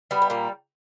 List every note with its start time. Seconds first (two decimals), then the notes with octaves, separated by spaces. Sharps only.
0.11 G3 B3
0.22 B3
0.30 A#2 A#3